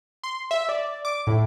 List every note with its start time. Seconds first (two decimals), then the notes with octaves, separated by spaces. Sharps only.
0.24 C6
0.51 E5
0.69 D5
1.05 D6
1.27 A2